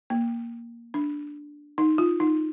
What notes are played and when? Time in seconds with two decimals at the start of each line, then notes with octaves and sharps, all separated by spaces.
0.10 A#3
0.94 D4
1.78 D#4
1.98 F4
2.20 D#4